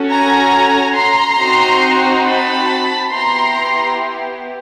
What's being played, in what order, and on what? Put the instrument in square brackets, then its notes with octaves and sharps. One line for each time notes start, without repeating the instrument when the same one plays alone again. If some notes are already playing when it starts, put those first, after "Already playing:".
Already playing: [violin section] C#4 F#4 A4
G#5 A#5
A#5 C6
C4 D#4 F#4
A5 B5
B3 E4 G4 A#5 C6